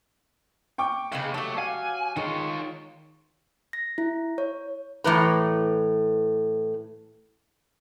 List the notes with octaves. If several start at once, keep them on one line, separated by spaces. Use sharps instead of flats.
G5 C#6 D6
D#2 C#3 B4 F5
F#3 A3 G4 A4
F5 F#5 G#5 F6
D#3 G#3 F4 C#5 C6
A#6
E4
C#5
A2 E3 B4 A#5